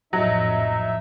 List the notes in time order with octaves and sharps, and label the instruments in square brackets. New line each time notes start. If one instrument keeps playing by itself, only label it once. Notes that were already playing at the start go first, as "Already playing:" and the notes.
[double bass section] A#1 F2 A2 [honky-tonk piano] F#3 [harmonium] D#4 E5